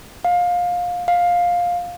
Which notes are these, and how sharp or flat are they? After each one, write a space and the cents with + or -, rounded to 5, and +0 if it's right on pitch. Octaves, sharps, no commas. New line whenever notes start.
F5 +25
F5 +15